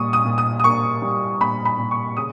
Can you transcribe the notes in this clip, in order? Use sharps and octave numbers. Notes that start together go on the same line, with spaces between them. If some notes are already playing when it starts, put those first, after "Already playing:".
Already playing: A#2 G3 C#6 D#6
D#6
A#2
D#6
D#6
A#3 C#6
G3
A#2 B5
B5
A#2
C#6
C#3 D#6